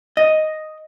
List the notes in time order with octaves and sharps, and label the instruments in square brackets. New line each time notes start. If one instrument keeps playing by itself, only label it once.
[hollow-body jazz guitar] D#5